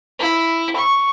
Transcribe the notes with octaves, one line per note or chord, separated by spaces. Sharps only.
E4
C#6